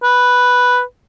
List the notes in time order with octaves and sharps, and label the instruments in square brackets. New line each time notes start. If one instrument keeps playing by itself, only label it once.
[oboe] B4